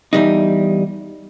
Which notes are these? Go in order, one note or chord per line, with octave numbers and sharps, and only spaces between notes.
E2 G3 D#4